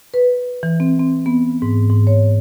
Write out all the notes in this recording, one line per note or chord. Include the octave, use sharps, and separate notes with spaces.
B4
E3
C4
C4
B3
G#2
G#2
C#5